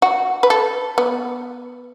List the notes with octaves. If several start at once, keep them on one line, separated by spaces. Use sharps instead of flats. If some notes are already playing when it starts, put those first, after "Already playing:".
F#4
B4
A4
B3